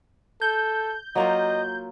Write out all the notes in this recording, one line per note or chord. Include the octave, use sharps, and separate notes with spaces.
A4 G6
F#3 A#3 F4 D#5